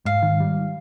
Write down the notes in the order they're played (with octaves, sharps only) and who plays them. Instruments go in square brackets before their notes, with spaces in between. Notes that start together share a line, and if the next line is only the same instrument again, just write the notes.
[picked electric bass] G#2 [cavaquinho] F5
[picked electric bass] D#3
G3